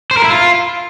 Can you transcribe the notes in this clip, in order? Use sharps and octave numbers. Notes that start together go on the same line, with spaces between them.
C5
A#4
E4
F4